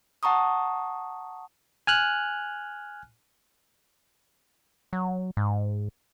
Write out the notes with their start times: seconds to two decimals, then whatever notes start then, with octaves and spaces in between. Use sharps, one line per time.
0.23 F#5 A5 A#5 C#6 D#6
1.87 G#5 F6 F#6
4.93 F#3
5.37 G#2